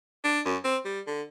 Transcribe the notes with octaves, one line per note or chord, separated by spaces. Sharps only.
D4
F#2
C4
G3
D3